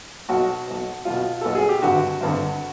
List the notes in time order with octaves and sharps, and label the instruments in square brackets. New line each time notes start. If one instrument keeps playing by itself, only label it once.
[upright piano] B1 B2 F#4
B1 B2
B1 B2 F4
B1 B2 A4
G#4
G4
G#1 G2 D3 F#4
G#1 G2 D3